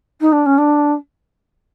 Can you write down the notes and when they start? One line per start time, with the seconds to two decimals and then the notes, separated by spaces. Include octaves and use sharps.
0.21 D#4
0.32 D4
0.46 C#4
0.58 D4